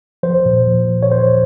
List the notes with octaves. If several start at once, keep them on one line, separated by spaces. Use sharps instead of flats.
F3 C5
A#2
F3
F3
C#5
A#2 C5